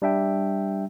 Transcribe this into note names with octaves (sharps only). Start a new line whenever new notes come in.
G3 D4 E5 G5